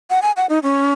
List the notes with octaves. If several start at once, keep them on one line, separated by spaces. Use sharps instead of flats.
F#5
G#5
F#5
D#4
C#4